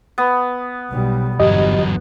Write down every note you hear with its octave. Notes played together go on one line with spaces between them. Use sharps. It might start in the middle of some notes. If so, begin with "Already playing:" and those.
B3
B1 B2 G3
G1 E2 F#3 G4 D#5